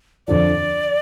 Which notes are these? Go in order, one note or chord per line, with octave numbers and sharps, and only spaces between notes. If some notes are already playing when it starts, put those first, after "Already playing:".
F2 D3 F3 D5